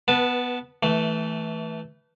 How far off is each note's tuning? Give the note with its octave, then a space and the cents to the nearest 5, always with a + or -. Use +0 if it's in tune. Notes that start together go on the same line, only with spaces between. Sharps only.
B3 +0 B4 -25 A5 -5
E3 -20 A3 +0